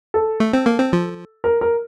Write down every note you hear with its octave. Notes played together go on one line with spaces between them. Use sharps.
A4
A3
C4
A#3
C4
F3
A#4
A#4